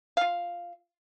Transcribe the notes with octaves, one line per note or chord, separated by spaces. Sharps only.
F4 F5